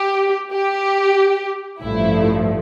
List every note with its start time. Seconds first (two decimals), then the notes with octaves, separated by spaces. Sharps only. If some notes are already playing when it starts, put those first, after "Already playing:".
Already playing: G4
0.53 G4
1.81 A1 G2 F3 A3 E4